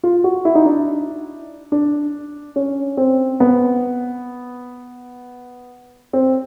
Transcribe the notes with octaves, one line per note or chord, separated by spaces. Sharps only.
F4
F#4
E4
D#4
D4
D4
C#4
C4
B3
C4